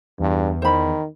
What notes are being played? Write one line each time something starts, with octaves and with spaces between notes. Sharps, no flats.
E2 G2
D#3 C5 B5